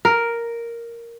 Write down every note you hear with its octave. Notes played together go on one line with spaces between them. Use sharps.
A#4